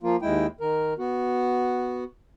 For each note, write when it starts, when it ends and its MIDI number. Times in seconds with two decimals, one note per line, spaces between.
0.03 0.16 53
0.03 0.16 58
0.03 0.16 65
0.22 0.47 39
0.22 0.47 56
0.22 0.47 64
0.22 0.47 79
0.61 0.94 51
0.61 0.94 70
0.99 2.04 59
0.99 2.04 66